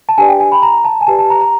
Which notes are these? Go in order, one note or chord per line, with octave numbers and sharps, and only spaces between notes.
A5
D4 G4 B4 D5 G#5
G5
G#5
B5
A#5
A5
G#5
G4 B4 D5 A5
A5
A#5
A#5